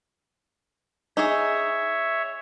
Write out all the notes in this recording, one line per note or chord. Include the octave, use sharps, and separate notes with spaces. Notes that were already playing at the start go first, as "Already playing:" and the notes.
D#4 G#4 C#5 E5